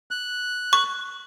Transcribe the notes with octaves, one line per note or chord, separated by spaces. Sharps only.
F#6
C#6